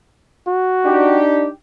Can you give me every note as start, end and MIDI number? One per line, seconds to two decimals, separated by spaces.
0.48 1.20 66
0.85 1.49 62
0.85 1.49 63
0.85 1.49 67